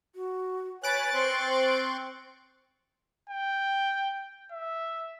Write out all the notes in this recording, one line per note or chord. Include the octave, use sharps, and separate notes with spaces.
F#4
B4 C#5 G#5 F#6 A6 D7
C4 C5 C6 C#6
G5
E5